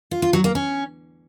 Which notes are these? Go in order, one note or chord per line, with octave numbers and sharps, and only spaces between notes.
F4
F4
F#3
A#3
C#4